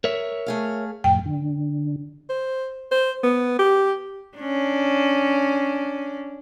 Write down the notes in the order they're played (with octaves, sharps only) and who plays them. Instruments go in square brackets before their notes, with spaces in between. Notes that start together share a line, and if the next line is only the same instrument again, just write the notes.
[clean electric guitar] A#4 C#5 E5
[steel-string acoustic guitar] A3 G#4 F5
[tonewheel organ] F2 A2 [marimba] G5
[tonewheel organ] D3
[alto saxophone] C5
C5
B3
G4
[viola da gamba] C#4 D4